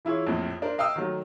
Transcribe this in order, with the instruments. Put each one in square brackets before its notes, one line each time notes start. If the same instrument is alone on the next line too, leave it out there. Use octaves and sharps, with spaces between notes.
[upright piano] E3 E4 F4 G#4 C#5
A#1 F2 A2
D4 A#4 C5
D#5 F5 G5 D#6 E6
D#3 F#3 A3